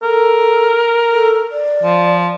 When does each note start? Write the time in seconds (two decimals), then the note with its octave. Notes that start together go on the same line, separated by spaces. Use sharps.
0.03 A4 A#4
1.12 A4
1.52 D5
1.83 F3